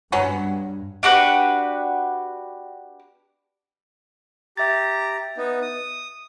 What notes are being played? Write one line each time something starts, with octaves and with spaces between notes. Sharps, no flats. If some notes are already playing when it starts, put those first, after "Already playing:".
G2 F#3 B3 C#4
D4 F#4 G4 B4
G4 E5 A#5 A6
B3 D#4
D#6